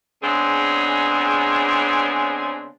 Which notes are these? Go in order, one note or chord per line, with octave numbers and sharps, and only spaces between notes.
C#3 G#3 B3 C4 D4 G#4